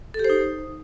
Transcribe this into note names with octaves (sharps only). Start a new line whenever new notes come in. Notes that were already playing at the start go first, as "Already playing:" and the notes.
A4
G4
C5
D#4